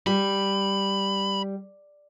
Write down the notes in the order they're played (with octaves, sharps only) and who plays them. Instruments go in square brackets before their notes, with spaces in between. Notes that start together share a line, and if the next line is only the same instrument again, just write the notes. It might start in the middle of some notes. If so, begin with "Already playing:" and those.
[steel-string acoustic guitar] G3 [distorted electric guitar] B5